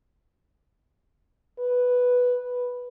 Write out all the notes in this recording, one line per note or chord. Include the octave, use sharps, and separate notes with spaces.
B4